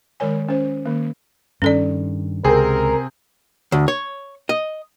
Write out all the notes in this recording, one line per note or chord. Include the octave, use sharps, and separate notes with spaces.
D#3 G#3 A#4 C#5 G#5
C#4 C5
D#3 A#3
G2 D#3 C#4 A4 D5
C#2 C3 C4 G#4 A#4
D2
C#5
D#5